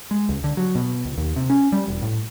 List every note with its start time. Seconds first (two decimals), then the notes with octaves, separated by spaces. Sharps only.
0.11 G#3
0.29 C#2
0.44 D3
0.57 F#3
0.75 B2
1.05 C#2
1.18 D#2
1.36 C3
1.50 C#4
1.72 G3
1.88 E1
2.02 A2